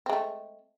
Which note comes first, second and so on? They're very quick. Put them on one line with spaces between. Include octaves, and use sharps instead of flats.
C4 G#3 A3